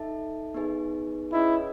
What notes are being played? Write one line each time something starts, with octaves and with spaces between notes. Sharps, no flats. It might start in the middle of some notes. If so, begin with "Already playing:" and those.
Already playing: D#4 A4 E5 A5
B3 D#4 G#4 B4
C#4 E4 G#4 B4 D#5